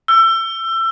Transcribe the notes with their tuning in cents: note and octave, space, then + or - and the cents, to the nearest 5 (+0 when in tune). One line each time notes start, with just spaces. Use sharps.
E6 +25